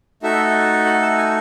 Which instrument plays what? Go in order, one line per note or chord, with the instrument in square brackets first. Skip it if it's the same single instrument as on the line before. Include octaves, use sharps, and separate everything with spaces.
[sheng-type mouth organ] A3 D#4 F#4 A4 E5
F#5
A5
G#5